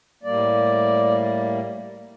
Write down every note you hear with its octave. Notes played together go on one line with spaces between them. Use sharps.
A2 G3 A#3 D5